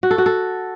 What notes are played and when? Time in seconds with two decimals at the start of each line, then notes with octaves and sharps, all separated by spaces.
0.03 F#4
0.11 A4
0.18 F#4
0.26 A4